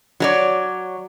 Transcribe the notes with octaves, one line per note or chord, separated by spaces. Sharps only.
F#3 C#5 D5